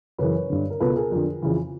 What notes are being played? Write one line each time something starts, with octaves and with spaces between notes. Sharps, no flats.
F#2 C#3 E3 B4 C#5
G2 D3
A#4
C#2 B2 A4 B4
G#4 A#4
F2 D3
F2 C#3 E3